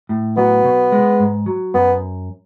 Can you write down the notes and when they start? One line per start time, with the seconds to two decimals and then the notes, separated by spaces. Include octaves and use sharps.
0.09 A2
0.37 F#3 B3
0.65 B2
0.92 G#3
1.20 G#2
1.46 F#3
1.74 F#2 B3